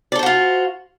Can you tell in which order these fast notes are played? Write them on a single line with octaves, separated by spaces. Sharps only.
D5 A4 C5 F#4 F4